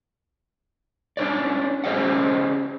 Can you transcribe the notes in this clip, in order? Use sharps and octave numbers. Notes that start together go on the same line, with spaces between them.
C#4 D4 F#4 B4 C#5 D5
C#4 G#4 C5 D5 D#5 F#5